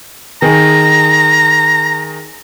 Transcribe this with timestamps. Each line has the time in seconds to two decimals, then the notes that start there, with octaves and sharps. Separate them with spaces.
0.42 D#3 G#4 A#5